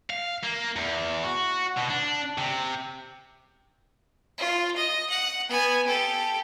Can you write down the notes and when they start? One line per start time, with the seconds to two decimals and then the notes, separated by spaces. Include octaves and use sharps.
0.10 F5
0.43 A#3
0.76 E2
1.24 F#4
1.77 B2
1.89 D4
2.38 C3
4.38 F4
4.76 D#5
5.09 F#5
5.49 B3 G#5
5.87 G4 A4